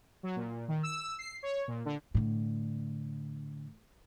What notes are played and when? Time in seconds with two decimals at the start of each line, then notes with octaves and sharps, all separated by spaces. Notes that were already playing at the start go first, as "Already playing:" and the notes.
0.23 F#3
0.36 A#2
0.68 D#3
0.83 E6
1.19 C7
1.43 C#5
1.68 A#2
1.85 D3
2.15 A2 D3